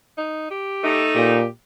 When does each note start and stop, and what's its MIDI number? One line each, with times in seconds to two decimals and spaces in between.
0.18 0.51 63
0.51 1.03 67
0.84 1.38 57
0.84 1.38 63
1.15 1.45 46
1.15 1.47 67